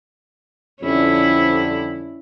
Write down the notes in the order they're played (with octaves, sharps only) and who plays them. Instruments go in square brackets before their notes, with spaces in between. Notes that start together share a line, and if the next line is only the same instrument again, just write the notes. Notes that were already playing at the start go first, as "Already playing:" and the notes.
[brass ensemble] F2 D3 G3 [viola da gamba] C#4 E4